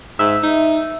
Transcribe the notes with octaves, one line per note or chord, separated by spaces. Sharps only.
G#2 E5
D#4